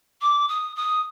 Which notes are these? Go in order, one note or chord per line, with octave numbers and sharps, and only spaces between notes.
D6
D#6
D#6